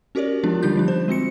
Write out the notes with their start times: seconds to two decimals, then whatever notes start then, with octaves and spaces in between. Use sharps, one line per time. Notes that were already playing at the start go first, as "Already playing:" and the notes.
0.15 C#4 F#4 G4 A#4 C#5 D5
0.44 F3 G#3 B3 D4 F4 G4
0.62 D3 G3 D#4 F4 G4 G6
0.76 F3 G3 D4
0.88 C5
1.08 G#3 C4 F#4 C#7